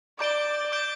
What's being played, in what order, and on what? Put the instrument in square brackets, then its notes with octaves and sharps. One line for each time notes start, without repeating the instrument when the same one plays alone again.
[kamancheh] D5 [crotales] D6 G6 D7 G7
[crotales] D6 G6 D7 G7